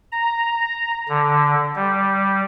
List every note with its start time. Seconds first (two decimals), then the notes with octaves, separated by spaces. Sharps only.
0.12 A#5
1.09 D3
1.76 G3